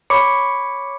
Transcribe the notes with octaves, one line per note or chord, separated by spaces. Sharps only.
C#5 B5 C#6 D6 C#7